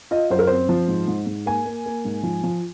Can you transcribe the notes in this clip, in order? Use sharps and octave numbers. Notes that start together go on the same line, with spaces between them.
F4 D#5
F#2 C5
A#4
C4 C5
F3
G#2
G#2
G#2
A#3 G#5
A#3
A#3
G#2
F3
F3